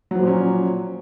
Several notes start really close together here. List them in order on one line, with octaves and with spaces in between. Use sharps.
F#3 F3 A#3 A#2 C#4